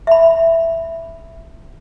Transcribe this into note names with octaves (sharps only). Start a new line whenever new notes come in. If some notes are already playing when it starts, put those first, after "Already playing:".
E5 B5